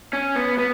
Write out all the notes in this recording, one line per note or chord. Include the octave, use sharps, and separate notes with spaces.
C#4
B3
B3